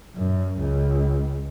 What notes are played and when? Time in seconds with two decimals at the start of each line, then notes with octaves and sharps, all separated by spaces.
0.16 F#2
0.58 C#2